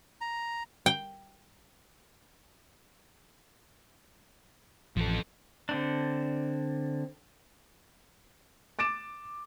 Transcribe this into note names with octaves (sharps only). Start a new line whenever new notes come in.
A#5
G5
A1 F3 A4
D3 C4 D4
D6 A6 D7 E7